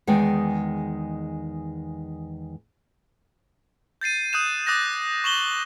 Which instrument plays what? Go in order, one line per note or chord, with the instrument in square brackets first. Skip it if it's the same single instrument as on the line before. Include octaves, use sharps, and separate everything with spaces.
[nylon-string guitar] E2 D#3 G#3 G5
[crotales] G6 A6 C7 D#7
D#6 F#6 G6 D#7 E7
D6 D#6 F#6 A6 A#6
C#6 E7 F#7 G7